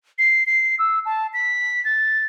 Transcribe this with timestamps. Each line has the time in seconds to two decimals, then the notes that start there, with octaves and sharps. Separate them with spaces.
0.19 C7
0.46 C7
0.79 E6
1.06 A5
1.34 B6
1.85 A6